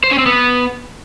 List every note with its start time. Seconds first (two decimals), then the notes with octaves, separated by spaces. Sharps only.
0.04 C5
0.11 C#4
0.19 C4
0.26 B3